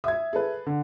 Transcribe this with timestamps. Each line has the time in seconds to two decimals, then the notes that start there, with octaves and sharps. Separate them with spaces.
0.04 E5 D#6 G#6
0.33 G#4 A4 B4
0.67 D3